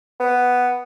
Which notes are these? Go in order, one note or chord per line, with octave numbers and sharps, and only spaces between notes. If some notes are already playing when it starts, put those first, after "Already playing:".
B3